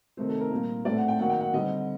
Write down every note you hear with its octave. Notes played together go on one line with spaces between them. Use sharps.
C3 D#3 A3 C4 C5
A4
A#4
A#2 G3 A#3
A2 A3 C4 D5
F#5
G5
D#3 F#3 A#3 F#5
G5
F#5
D3 G3 C4 D#5